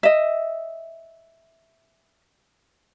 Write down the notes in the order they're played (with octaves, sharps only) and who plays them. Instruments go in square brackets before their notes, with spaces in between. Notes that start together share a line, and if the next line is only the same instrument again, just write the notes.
[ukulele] D#5 E5